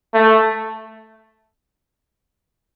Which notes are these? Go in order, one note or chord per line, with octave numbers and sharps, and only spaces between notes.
A3